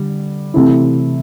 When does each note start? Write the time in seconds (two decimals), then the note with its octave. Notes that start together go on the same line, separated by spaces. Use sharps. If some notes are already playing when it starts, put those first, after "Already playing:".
Already playing: D3 G3
0.54 C3 E3 A3 C4 E4